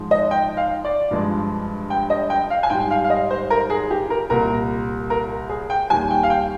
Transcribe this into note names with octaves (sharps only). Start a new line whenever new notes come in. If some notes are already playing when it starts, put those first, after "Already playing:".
Already playing: G#2 F3 G#3
D#5
G5
F5
D5
G2 F3 G#3
G5
D#5
G5
F5
G#5
G#2 G3 G5
F5
F5
D#5
C5
A#4
G#4
G4
A#4
C2 A#2 G3 A#4
A#4
G#4
G5
D#2 D#3 G3 G#5
G5
F5
G5